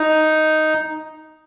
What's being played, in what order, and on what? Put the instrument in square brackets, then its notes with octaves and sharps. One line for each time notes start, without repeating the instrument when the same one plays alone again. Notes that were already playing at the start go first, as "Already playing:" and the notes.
Already playing: [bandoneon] D#4